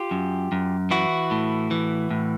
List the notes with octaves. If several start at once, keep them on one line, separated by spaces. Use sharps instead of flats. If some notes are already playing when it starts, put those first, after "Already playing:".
Already playing: F4 G4
F#2
F#2
E3 E4 F#4
A2
E3
A2